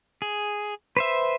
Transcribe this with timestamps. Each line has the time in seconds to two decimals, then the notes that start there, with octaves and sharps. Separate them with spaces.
0.22 G#4
0.97 B4 C5 E5